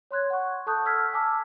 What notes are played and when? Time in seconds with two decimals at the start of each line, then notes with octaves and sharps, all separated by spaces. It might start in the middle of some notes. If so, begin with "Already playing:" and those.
0.11 C#5 C6 F#6 G#6
0.30 F#5 C#6
0.66 A4 A5 C#6 D#6 F#6 G6
0.86 E6 F6 G#6 B6
1.13 G#5 A5 D6 E6